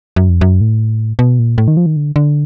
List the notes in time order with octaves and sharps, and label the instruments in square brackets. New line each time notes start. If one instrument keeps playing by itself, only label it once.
[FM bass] F#2
F2
F#2
A2
B2
A#2
A2
D#3
F3
D#3
D3
D3